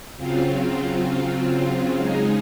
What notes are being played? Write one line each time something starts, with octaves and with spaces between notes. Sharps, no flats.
C#3 F#3 C4 F4
C#3 G#3 D#4 G#4